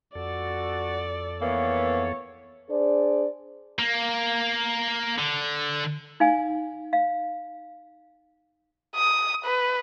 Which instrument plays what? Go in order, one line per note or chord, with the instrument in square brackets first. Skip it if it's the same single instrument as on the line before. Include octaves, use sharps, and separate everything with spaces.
[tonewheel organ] F2 A4 [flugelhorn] F#4 [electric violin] D5
[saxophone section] E3 A#3 B3 [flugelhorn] C#5
[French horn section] D4 G#4 C5 D5
[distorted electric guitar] A#3
D3
[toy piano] D#4 F5 G#5
F5
[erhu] D#6
B4